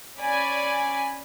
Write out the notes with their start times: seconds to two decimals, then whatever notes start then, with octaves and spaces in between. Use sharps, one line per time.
0.20 C#4 D5 G#5 B5